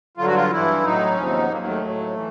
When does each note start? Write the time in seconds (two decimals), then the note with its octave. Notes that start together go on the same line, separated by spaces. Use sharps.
0.17 G2 D3 F#3 F4
0.26 F#4
0.36 F4
0.51 G2 E3 E4
0.83 A2 F#3 D#4
1.12 C#4
1.17 D#2 C#3 F3
1.25 C4
1.37 B3
1.49 D#2 D#3 F#3 A#3
1.66 A3
1.82 A2 F#3
2.14 E3